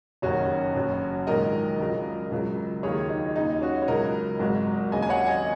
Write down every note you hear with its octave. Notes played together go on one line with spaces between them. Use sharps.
F#1 F#2 D#3 C#4 F#4
F#1 F#2 F#3
A#1 G#2 D#3 F#3 A#4 D#5
C#2 C#3 F#3
C#2 C#3 F#3
D#2 D#3 F#3 G#4 C#5
D#4
D#2 C#3 F#3 D#4
C#4 F#4
C#5
C#2 C#3 F#3 A#4 D#5
G#1 G#2 F#3
D#2 C#3 F#3 D#5 G#5
G#5
C#5 F#5
D#5 G#5